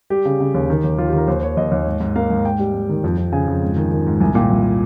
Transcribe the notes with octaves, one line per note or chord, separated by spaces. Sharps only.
G3 G4
C#3
C#3
D#2
D#3
D#2
D#2 F4
D#3 G4
A#4
D#2 C5
D#2 C#5
D#2 D#5
D#2
G#2
G#2
A#3 F5
G#2
G#2 G5
G3
G#2
D#3
F2
F2
C#3 G#5
F2
G#2
D#3
D#3
G#2
C2 G#5
A#2 G5
C2